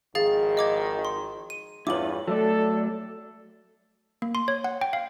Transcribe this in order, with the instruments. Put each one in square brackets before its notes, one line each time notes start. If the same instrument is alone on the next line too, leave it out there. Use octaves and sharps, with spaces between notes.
[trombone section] G#1 D#3 F3 [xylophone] G#4 F5 A6
[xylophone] D#5 D6 G#6
C6
D#7
[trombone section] E2 G2 [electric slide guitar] E4 F4 C#5 [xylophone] D6 F#7
[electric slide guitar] F#3 A3 D5 [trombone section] A4
[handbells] A#3
C6
C#5
F#5
G5
F5